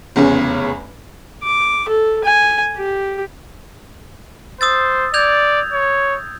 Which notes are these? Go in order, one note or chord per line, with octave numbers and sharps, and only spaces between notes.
F1 E2 C#3 C#4
D6
A4
G#5
G4
C5 D#6 E6 A6
D5 G6 G#6 F7
C#5